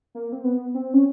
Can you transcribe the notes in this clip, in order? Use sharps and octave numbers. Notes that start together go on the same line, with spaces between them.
A#3
C4
B3
C4
C#4